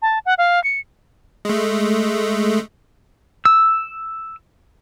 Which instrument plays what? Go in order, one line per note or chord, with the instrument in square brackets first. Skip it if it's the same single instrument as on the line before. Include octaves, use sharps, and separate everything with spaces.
[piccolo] A5
F#5
F5
C#7
[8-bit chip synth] G#3 A3
[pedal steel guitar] E6